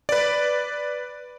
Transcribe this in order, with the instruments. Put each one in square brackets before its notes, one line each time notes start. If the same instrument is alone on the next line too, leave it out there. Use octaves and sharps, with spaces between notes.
[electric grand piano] B4 D5